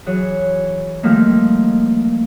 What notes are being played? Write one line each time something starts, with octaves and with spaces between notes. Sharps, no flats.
E3 F#3 G#4 C#5
D#3 F3 G3 A3 A#3 D#4